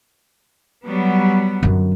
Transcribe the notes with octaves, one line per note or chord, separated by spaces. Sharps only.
F#3 G3 B3
F#2 D3